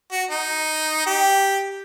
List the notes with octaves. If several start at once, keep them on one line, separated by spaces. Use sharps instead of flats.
F#4
D#4
G4